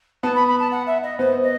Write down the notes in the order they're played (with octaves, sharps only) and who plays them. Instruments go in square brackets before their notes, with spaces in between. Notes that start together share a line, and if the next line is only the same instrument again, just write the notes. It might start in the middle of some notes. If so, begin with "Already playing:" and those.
[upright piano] B3 [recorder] A5
[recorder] B5
B5
A5
F#5
E5
D#5
[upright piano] B3 [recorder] C5
[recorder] D#5